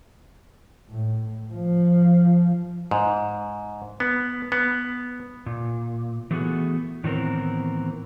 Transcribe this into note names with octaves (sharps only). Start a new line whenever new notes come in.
A2
F3
G#2
B3
B3
A#2
E3 F#3 A3 B3 F#4 G#4
A2 D#3 E3 B3 C4 A#4